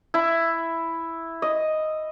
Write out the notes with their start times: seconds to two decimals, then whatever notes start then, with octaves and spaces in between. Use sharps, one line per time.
0.14 E4
1.42 D#5